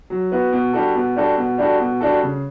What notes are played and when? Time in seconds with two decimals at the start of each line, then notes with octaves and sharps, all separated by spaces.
0.10 F#3
0.32 B3 F#4
0.53 B2
0.73 G3 D4 F#4 A4
0.95 B2
1.16 G3 D4 F#4 A4
1.37 B2
1.58 G3 D4 F#4 A4
1.80 B2
2.01 G3 D4 F#4 A4
2.23 C#3